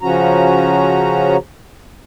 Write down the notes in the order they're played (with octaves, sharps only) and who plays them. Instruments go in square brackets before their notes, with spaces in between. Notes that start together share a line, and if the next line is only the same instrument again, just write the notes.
[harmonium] C#3 F3 C#4 F#4 A#5